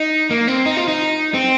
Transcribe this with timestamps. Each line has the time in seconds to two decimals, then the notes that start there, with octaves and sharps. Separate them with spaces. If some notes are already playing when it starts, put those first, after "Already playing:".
Already playing: D#4
0.31 A#3
0.48 C4
0.66 D#4
0.77 F4
0.88 D#4
1.34 C4